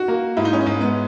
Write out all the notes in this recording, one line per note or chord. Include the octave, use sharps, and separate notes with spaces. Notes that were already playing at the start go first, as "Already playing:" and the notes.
Already playing: F#4
A#3
G#2 E4
D#4
C#4
D#4
G#2
B3